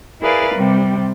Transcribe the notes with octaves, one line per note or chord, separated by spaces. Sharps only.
E4 G#4 A#4 B4 D5 F5
C3 G3